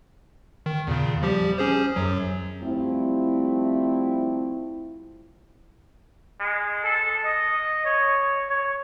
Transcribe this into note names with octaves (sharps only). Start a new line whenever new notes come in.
D#3
E2 A#2 C#3
F3 G3 G4
C#4 G#4 C5
F#2 F#3
F3 G3 A3 C4 E4
G#3
A4
D#5
C#5
C#5